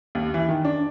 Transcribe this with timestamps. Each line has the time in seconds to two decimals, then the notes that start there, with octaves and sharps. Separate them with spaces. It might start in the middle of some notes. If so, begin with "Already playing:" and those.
0.15 D#2
0.34 E3
0.49 D#3
0.65 D4